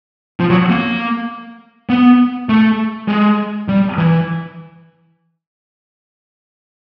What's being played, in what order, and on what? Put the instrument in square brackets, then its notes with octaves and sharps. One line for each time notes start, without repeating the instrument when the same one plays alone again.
[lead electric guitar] F3
F#3
A#3
B3
A3
G#3
G3
E3